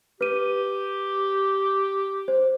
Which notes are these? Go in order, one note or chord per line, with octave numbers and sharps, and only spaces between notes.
G4 B4 D#7
C5